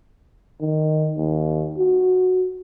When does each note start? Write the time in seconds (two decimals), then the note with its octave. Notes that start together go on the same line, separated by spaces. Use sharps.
0.61 D#3
1.17 D#2
1.78 F#4